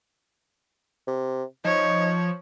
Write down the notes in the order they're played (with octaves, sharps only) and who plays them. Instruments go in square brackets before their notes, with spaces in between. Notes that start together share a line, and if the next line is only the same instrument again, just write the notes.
[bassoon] C3
[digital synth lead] F3 [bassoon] D#4 [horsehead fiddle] C#5